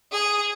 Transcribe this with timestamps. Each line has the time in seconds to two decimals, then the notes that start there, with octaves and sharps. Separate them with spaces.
0.12 G#4